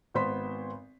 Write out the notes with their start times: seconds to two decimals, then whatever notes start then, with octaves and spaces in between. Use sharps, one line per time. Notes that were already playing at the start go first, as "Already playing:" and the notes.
0.14 G#1 B3 C5 C6 B6